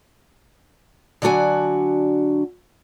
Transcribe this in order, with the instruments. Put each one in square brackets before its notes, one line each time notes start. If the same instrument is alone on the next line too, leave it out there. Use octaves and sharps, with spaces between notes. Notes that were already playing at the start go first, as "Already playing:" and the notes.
[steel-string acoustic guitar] D3 F#3 D4 F#4 G#5